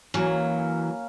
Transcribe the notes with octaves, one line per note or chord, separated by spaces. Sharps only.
E3 F#3 A#3 C#4